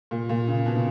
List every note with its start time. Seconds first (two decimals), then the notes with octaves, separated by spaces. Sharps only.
0.11 A#2
0.29 A#2
0.48 C#3
0.66 B2
0.75 C#3